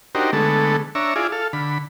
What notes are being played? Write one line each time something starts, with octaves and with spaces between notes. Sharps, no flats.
D4 D#4 F#4 G4 A#4 C5
D3 G#3 A3 B3 A4
D4 C#5 E5 A#5
E4 F4 G#4 D5
A4 F5
D3 B5